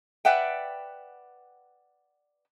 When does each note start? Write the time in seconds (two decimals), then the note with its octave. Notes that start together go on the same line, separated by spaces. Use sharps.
0.25 B4 D5 E5 F#5 G5